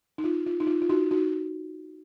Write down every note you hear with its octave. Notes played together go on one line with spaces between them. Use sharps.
D#4
F4
F4
D#4
F4
F4
D#4 F#4
D#4 F#4